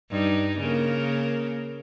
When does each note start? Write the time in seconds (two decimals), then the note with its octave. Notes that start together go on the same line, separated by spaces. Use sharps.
0.11 G2 D#4
0.59 C#3 A#3 A#4